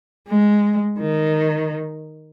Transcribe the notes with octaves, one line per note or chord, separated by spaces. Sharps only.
G#3
D#3